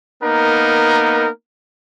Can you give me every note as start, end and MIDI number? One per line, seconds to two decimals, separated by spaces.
0.23 1.27 58
0.23 1.27 59
0.23 1.27 63
0.23 1.27 70